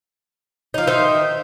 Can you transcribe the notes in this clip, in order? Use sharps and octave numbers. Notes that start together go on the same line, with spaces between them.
F3 D#4
D#3 D#4 C5 E5